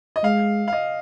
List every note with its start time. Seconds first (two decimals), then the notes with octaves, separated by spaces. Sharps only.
0.16 D#5
0.23 G#3 F5
0.68 F5
0.73 D#5